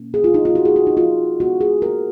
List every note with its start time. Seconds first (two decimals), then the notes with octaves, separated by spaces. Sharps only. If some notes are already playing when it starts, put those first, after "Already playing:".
Already playing: B2 A#3 C#4
0.14 G#4
0.24 F4
0.34 D#4
0.45 F4
0.55 F#4
0.65 G#4
0.76 F#4
0.87 D#4
0.97 F4
1.40 C#3 G#3 B3 F#4
1.61 G#4
1.82 A#4